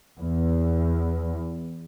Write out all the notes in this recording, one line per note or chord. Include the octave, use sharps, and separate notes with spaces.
E2